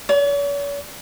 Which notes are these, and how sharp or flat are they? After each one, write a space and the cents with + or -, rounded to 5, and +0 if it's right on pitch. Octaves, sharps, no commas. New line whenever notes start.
C#5 +45